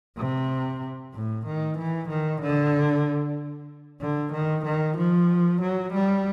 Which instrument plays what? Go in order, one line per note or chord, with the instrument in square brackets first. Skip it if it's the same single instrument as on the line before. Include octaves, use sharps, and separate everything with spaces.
[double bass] C3
A2
D#3
E3
D#3
D3
D3
D#3
D#3
F3
F#3
G3